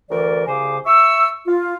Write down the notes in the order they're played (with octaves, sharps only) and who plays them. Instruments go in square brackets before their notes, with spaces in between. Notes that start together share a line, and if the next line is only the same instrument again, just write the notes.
[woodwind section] D2 E3 A#4 D5
C2 C#3 C5 G#5 D6
E5 C#6 E6
F4